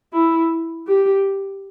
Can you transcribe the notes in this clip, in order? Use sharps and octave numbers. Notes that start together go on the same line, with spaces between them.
E4
G4